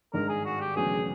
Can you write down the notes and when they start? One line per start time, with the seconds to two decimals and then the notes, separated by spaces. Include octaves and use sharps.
0.13 G#1 G2 D#3 G#3 A#4
0.29 G#4
0.45 F#4
0.60 G4
0.76 E1 D2 C#3 F#3 B3 G#4